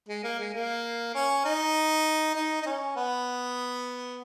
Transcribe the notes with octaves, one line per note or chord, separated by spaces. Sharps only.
G#3
A#3
G#3
A#3
C#4
D#4
D#4
D#4
C#4
B3